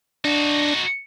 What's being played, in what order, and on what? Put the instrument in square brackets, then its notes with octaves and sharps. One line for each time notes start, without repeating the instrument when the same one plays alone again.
[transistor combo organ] D4 [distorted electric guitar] D#4 F#4